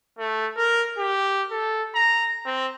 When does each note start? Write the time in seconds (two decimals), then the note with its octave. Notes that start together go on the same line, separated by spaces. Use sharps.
0.19 A3
0.57 A#4
0.98 G4
1.51 A4
1.95 A#5
2.46 C4